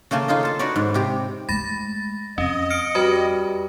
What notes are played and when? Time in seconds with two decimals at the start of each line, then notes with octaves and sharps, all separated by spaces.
0.11 C#3 A3 A#3 G#5 A5
0.28 D#4 F4 G#4 D#5
0.43 A4 A5
0.59 D#4 F#4 B4 C#5 D5
0.76 G#2
0.94 C3 G4
1.49 G#3 A3 B5 A6 A#6
2.38 F2 C#4 D#5
2.70 F6 C#7 D7
2.95 G3 F#4 B4 B5